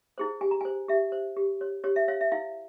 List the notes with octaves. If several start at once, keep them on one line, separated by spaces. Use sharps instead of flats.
E4 G#4 C5
G4 G#5
A#5
G#5
C5
G4 E5
C5
G4
C#5
G4 C#5
E5
C#5 F5
E5
E4 F5